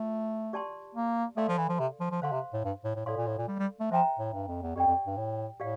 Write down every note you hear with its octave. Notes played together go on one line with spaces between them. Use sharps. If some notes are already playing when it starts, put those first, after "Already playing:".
Already playing: A3 F4
G4 D5 A5 C6
A#3
A3 A4 D5 F5 C6
F3
E3
F3
C3
F3
F3
D3 C5 F5 C6
C3
A2
G2
A2
A2
A2 A4 D5 F5 C6
A#2
A2
A#2
G3
G3
A3
F3 C5 E5 G5 A#5
A2
G2
F2
E2
F2 G4 D5 G5
F2
G2
A2
A2 G4 D5 F5